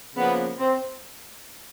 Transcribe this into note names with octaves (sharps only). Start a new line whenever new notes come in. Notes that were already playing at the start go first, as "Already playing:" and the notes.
C#3 F3 A#3 B3
C4